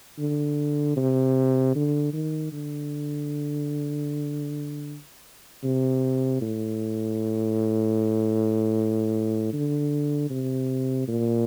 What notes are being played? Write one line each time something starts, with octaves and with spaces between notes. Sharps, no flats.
D3
C3
D3
D#3
D3
C3
A2
D3
C3
A#2